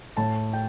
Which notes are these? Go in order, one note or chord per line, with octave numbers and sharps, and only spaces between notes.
A2 A5
G5